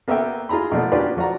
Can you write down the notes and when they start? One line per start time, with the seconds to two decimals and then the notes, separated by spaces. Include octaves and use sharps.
0.08 A#3 B3 F#4 A4 E5 G5
0.49 F4 G#4 A#5 B5
0.72 B2 D3 F3 A3 A#3
0.92 C#4 D4 F4 G4 B4
1.17 F3 F#4 D5 A#5